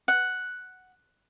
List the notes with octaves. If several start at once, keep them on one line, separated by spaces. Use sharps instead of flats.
F#5